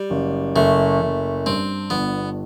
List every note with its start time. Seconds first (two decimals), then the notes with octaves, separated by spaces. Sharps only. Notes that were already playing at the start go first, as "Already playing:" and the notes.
Already playing: G3
0.10 F#1
0.55 F#1 A3
1.01 F#1
1.46 G2 C4
1.90 G1 B3